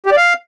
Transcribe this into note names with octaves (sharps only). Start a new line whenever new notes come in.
G4
D5
F5